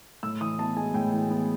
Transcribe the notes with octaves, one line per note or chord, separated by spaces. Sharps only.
A2 E6
E3 D#6
B3 A5
G#3 G#5
A2 G5
E3
B3